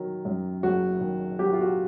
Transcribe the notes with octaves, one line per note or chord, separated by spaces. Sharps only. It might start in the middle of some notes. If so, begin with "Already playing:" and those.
Already playing: D#3 F#3
F#2
F#1 F#4
D#3
F#3 G4
F#4
F4
F#4